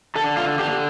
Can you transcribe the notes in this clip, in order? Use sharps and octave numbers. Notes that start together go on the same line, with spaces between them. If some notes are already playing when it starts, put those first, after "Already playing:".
D3 A4
F4
D3 G4